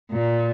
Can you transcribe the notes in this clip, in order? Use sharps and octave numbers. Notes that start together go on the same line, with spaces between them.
A#2